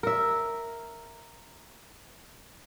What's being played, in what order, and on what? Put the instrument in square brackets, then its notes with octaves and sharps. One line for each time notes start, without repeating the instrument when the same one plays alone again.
[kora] A#4 E5